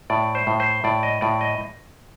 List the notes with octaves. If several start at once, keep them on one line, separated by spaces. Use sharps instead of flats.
A2 D5
C5
A2
C5
A2 D5
D#5
A2 D5
D#5